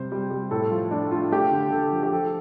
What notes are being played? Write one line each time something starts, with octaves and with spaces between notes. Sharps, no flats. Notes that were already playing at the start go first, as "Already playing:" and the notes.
Already playing: C3 G3 C5
G3
G3
A2 A4
F3 F4
A3 D4
A3 F4
A3 G4
D3
D3 A4
F3
G4
F3 A4